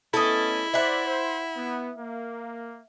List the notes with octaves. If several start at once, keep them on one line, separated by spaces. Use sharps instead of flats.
A3 B3 C#4 E4 A4 D#5
C5 D5 E5 F#5
C5
B3
A#3